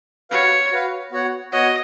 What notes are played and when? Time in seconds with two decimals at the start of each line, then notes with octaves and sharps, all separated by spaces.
0.30 F#4 B4 C#5 F5
0.72 F#4 B4 F5
1.11 B3 F#4 C#5 F#5
1.52 B3 F#4 C#5 D#5 F#5